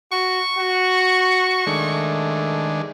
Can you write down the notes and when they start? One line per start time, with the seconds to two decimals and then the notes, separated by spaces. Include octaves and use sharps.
0.12 F#4 C#6
0.58 F#4
1.67 D#3 G#3 A3 D4